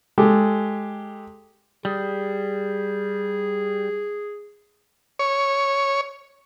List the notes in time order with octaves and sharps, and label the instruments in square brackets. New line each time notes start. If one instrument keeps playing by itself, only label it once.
[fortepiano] G#3 G4 A4
[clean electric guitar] G3 [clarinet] G#4
[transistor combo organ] C#5